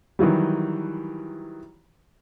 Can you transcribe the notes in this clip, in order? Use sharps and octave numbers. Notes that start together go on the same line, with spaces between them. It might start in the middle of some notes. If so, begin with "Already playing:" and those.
D#3 E3 F#3 G3